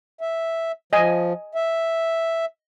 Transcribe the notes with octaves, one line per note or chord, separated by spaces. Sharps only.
E5
F3 D#5 G#5
E5